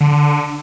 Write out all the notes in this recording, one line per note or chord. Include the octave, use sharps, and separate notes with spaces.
D3